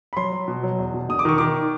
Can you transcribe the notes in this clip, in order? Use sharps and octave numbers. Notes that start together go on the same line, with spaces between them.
B5
F#3 C6
F#3
B2
F#3
E2
B2
E1 D#6
D6
D#3 C#6
D#3 D6